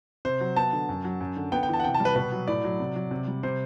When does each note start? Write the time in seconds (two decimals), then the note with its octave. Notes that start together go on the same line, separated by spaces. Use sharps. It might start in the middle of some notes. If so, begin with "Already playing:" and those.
0.25 C3 C5
0.41 F#3
0.56 B3 A5
0.73 D3
0.89 F#2
1.04 F#3
1.21 F#2
1.37 D3
1.52 B3 G5
1.63 G5
1.69 E3 A5
1.80 F#5
1.84 C3 G5
1.94 A5
2.00 G3
2.05 B4
2.16 B2 B4
2.32 F#3
2.48 A2 D5
2.64 F#3
2.80 C3
2.96 F#3
3.11 C3
3.28 G3
3.43 C3 C5